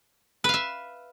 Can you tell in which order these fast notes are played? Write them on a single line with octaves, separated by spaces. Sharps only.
B4 F5 E5